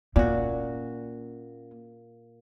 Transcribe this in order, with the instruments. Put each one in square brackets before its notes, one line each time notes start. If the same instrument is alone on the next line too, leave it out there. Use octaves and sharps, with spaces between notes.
[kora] A#2 F#4 [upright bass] A#3 C#4